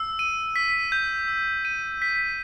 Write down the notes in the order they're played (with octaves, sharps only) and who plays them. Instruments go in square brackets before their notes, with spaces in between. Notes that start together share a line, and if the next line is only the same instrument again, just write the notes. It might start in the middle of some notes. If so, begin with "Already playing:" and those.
Already playing: [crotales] E6
D#7
B6
G6
E6
D#7
B6